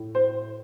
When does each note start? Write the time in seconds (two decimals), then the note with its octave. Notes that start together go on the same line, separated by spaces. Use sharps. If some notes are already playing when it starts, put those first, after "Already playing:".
Already playing: A2
0.15 C5